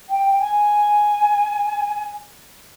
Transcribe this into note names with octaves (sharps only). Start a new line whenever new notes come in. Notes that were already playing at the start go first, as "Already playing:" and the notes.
G5
G#5